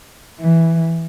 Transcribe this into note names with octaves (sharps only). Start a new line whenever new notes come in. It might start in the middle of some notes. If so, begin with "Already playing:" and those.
E3